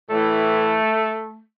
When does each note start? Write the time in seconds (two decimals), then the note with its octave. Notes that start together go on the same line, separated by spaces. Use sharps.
0.10 A2 E3 A3